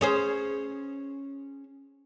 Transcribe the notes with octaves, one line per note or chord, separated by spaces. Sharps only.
C#4 G#4 C5